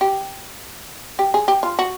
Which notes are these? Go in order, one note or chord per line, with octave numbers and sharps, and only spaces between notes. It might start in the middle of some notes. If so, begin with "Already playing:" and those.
G4
G4
G#4
G4
F4
F#4